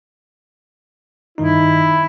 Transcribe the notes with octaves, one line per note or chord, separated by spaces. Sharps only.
G2 D#3 D#4 E4